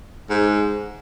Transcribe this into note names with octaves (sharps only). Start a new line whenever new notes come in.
G#2